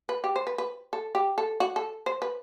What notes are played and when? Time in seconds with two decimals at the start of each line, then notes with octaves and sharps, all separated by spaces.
0.09 B4
0.24 G4
0.36 C5
0.47 B4
0.58 B4
0.93 A4
1.15 G4
1.38 A4
1.60 F#4
1.76 A4
2.06 C5
2.22 B4